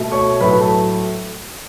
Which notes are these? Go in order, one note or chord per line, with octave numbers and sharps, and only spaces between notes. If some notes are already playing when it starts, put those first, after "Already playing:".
Already playing: B2 A3
C#5 C#6
A2 F#3 A3 B4 B5
A4 A5